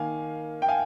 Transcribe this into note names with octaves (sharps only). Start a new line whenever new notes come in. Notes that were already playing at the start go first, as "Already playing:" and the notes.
Already playing: D#3 A#3 F5 G#5
G5
F5 G#5